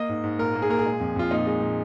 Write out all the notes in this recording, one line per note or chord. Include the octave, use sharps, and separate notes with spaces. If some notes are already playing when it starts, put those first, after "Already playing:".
Already playing: A#3 D#5
G#2
G#2
A#2 A#4
A#3
G#4
A#2 A#4
G#4
G#3
F2
F2 F4
A#2 D#4
G#3
A#2